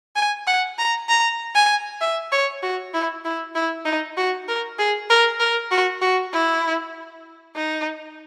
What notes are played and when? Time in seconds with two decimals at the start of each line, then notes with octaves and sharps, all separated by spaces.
0.16 G#5
0.47 F#5
0.78 A#5
1.09 A#5
1.55 G#5
2.01 E5
2.32 C#5
2.62 F#4
2.94 E4
3.25 E4
3.55 E4
3.85 D#4
4.17 F#4
4.48 A#4
4.78 G#4
5.10 A#4
5.40 A#4
5.71 F#4
6.01 F#4
6.33 E4
7.55 D#4